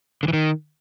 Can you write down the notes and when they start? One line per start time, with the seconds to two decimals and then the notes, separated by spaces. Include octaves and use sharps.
0.23 D3
0.28 E3
0.33 D#3